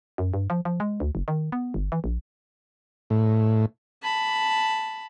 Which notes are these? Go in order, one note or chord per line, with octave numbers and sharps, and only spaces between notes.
F#2
G2
F3
F3
G#3
D2
F#1
D#3
B3
G1
E3
A#1
A2
A5 B5